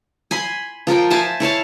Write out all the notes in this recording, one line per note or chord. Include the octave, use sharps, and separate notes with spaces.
G#5 B5 C6
F3 F4 A#4 G5
C5 E5 G#5 A5
E4 C#5 F5 A5